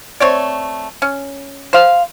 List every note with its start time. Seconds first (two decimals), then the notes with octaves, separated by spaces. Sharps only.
0.20 A3 C4 C#5 D5
1.02 C#4
1.73 C5 F5